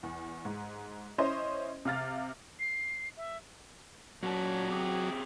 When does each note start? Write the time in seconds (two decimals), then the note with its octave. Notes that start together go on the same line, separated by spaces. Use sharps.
0.03 E2
0.45 G#2
1.18 C#4 E4 C5 D#5 C6
1.85 C3 F5 F6 A6
2.60 C7
3.17 E5
4.23 A#2 F#3 C#4 A5
4.70 C4 G4 G#4